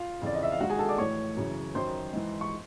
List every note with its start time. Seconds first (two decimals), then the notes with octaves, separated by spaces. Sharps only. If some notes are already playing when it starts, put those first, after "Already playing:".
Already playing: F4 F5
0.22 F2 C#3 E3 D5
0.35 D#5
0.43 E5
0.51 F5
0.60 G#2 D#3 F#4 F#5
0.70 G#4 G#5
0.79 A4 A5
0.88 D5 D6
0.98 A2 E3 C#5 C#6
1.37 F#2 C#3 E3
1.75 F#2 D#3 C5 C6
2.13 G#2 E3
2.41 C#6